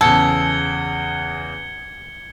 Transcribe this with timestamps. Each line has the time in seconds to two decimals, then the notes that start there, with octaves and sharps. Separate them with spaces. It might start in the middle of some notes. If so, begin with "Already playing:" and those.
0.01 E2 C#3 A4 G#6 C#7 G7